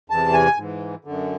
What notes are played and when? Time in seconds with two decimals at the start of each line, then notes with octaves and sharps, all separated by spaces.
0.10 E2 C3 E3 A5
0.34 G#5
0.57 G#2 E3
1.05 F#2 D3